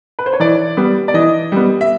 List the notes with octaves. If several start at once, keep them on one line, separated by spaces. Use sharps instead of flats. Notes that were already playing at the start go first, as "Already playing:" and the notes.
B4
C5
C#5
E3 D5
G3 B3
D5
E3 D#5
G3 B3
E5